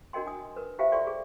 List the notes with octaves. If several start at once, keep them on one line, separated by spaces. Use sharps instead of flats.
D4 F#4 A#4 D#5 G5 C6
D4 G#5 D#6
A#4 B4
F4 G4 C5 E5 F5 G5
F4 A4 D5 G5 C6 C#6
G#4